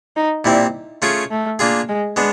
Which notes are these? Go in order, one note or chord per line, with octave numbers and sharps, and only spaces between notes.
D#4
A#2 G3 C4 E4
A3 C#4 F4 G#4
A3
A#3 D4 F4 G#4
G#3
G#3 B3 D4